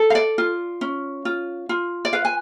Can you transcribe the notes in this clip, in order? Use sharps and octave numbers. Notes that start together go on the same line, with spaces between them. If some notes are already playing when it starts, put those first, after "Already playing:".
Already playing: A4
F5
D5
F4
C#4
F4
F4
D5
B4 F5
G#5